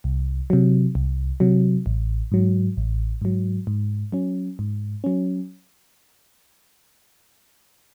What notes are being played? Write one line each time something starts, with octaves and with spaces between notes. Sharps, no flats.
C2
C3 F#3
C2
C3 F#3
A1
G#2 F#3
A1
G#2 F#3
G#2
F#3 C#4
G#2
F#3 C#4